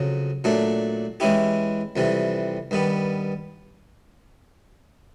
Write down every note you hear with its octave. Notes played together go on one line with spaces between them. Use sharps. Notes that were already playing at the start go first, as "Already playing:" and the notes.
Already playing: F2 C#3 F#3
A#2 F#3 A3 D4
E3 G#3 C#4 E4 G4
F2 C3 E3 G3
G2 D#3 G3 B3